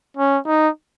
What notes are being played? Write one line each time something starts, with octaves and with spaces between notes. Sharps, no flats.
C#4
D#4